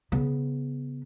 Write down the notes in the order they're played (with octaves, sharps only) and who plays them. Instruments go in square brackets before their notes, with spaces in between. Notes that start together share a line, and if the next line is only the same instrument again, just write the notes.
[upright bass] C#3 B3